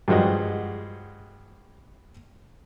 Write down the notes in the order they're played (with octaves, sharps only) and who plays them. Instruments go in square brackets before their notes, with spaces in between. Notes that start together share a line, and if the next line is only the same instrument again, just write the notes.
[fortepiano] G2 F3 G#3 F#4 D#5